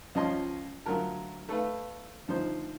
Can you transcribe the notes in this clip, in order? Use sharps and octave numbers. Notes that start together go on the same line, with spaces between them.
C#2 F3 C#4 D#5 A5 C6
D2 F#3 F4 A#4 A5
A3 A4 B4 F5
D2 F3 D#4 C5